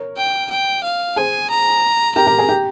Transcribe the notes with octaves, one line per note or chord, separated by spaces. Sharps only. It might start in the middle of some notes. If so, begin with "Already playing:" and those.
Already playing: A#4 C#5
G5
G5
F5
G#4 C5 G#5
A#5
G4 A#4 A#5
G4 A#4
G#4
G4